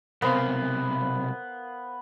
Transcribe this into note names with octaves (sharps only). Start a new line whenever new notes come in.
B1 C3 B3 A#4 C5 F5